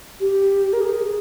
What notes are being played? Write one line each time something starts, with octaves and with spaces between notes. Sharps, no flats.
G4
A#4
G#4